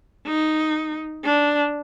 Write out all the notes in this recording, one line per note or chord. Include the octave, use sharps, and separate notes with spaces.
D#4
D4